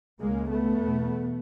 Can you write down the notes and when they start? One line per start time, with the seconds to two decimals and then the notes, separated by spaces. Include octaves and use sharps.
0.20 C#2 C#3 G#3 A#3
0.49 A3 B3
0.77 E2 B2